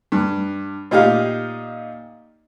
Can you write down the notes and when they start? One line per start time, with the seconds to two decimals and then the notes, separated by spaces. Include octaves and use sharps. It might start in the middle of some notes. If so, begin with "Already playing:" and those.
0.12 G2
0.91 A#2 D#4 G4 F5